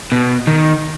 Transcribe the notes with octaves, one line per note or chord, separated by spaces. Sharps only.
B2
D#3